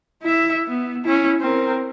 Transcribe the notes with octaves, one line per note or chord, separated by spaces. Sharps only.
E4 E5
B3
C#4 E4
C4 A#4